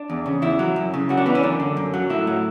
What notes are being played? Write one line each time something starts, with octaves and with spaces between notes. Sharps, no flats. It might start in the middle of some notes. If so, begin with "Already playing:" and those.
Already playing: D4
E2
C#3
E2 E4
F#3
F#2
C#3
F#2 F#4
D4
E3 B3
C#4
F#2 D4
D3
F#2
F#3
A2 E4
F#3